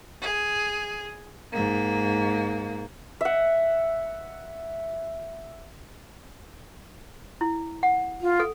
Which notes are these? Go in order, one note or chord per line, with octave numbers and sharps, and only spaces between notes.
G#4
G#2 A#3
E5 F#5
E4
F#5
F4
A4